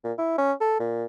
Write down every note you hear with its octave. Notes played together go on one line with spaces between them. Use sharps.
A#2
E4
C#4
A4
A#2